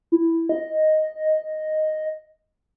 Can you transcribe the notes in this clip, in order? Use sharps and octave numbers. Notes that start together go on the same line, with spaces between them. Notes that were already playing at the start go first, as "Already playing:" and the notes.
E4
D#5